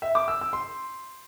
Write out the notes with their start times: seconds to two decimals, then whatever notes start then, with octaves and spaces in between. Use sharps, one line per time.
0.02 E5
0.15 D6
0.28 E6
0.41 E6
0.53 C6